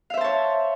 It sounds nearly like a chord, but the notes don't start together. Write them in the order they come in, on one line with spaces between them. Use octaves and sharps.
F5 E5 C5 A5 C#5